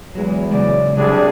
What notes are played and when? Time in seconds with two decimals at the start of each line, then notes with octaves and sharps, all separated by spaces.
0.15 E2 F#3 G#3
0.51 C#3 F#3 G#3 D5
0.97 C2 F#3 D4 G#4